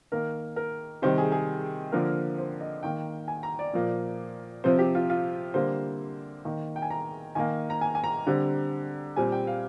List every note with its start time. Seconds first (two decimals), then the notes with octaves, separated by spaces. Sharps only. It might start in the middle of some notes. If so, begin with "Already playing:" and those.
0.12 D#3 A#3 A#4
0.56 A#4
1.02 C3 D#3 G3 C5
1.18 G#4
1.32 G#4
1.92 D3 F3 A#3 A#4
2.38 C5
2.61 D#5
2.83 D#3 A#3 G5
3.28 G#5
3.43 A#5
3.59 D5
3.73 A#2 F3 A#3
4.64 C3 F3 C4 C5
4.79 G4
4.95 F4
5.10 F4
5.54 D3 G3 A#3 C5
6.45 D#3 A#3
6.76 G5
6.82 G#5
6.90 A#5
7.35 D#3 A#3 G#5
7.70 A#5
7.81 G#5
7.95 G#5
8.04 A#5
8.27 D3 G3 C4
9.16 A#2 G3 C4 G#5
9.32 G5
9.47 F5